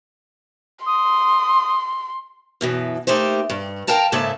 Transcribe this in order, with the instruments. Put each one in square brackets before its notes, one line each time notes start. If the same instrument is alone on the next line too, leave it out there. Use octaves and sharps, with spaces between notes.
[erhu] C6 [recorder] D#6
[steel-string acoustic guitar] F#2 B2 E3
A3 A#3 D#4 G4 C5
G2
A#4 F5 G5 A5 A#5
G#2 C#3 A#3 A4 E5 A5